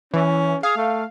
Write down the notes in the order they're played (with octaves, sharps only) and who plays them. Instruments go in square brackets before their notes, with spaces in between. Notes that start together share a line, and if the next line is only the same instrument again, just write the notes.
[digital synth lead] E3 [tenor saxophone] C#4
[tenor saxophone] G#4 [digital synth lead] F5
[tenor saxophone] A3